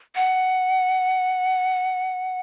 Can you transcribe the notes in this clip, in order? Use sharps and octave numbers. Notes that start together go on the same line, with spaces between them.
F#5